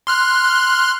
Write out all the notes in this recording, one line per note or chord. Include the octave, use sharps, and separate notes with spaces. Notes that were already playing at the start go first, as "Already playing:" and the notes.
C6 F6 F#6